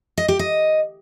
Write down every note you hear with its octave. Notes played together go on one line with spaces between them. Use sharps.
D#5
G4
D#5